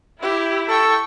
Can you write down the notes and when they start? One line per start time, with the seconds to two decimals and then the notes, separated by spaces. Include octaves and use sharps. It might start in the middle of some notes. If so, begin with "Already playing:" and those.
0.23 E4 G4
0.69 A4 G5 C#6